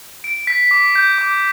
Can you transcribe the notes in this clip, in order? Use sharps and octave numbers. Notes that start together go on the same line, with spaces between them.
D7
B6
D6
G6
D6